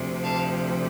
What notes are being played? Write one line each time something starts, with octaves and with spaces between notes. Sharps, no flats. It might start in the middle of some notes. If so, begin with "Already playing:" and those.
Already playing: D2 C3 F3
F5 A5